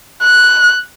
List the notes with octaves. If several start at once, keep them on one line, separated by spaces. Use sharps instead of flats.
F#6